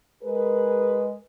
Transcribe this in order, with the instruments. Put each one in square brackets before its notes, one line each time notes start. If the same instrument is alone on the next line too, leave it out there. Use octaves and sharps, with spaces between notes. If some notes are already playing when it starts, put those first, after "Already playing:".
[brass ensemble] G#3 G#4 A#4 B4